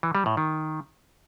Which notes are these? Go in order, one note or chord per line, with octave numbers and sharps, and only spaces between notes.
E3
G3
A2
D#3